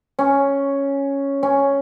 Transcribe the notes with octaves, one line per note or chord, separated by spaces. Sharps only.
C#4
C#4